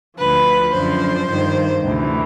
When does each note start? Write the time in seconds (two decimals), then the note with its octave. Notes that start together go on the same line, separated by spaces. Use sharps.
0.18 D2 D3 F3 B4
0.74 F#2 D3 F3 C5
1.29 G2 D#3
1.84 D2 C3 E3